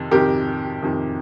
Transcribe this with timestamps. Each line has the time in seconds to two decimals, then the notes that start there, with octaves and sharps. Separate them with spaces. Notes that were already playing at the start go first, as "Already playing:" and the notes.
Already playing: F2 C3 D#3
0.11 F2 C3 D#3 G4 A#4
0.82 F2 C3 D#3